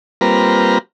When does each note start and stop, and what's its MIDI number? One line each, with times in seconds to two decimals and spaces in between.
0.21 0.78 55
0.21 0.78 58
0.21 0.78 60
0.21 0.78 65
0.21 0.78 71
0.21 0.78 82